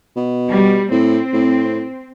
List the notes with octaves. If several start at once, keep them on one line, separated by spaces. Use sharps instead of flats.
B2
G3
A2 C4
A2